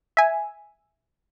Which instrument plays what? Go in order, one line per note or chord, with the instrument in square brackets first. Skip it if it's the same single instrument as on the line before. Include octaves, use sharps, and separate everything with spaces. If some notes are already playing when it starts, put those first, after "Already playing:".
[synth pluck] E5 G#5